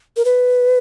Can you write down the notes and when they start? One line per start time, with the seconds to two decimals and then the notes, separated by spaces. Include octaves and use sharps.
0.17 A#4
0.25 B4